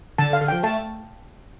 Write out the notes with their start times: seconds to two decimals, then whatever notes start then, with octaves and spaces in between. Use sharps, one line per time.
0.18 D3 A5
0.30 D3
0.33 F5
0.41 D3
0.48 F3 G5
0.63 A3 A5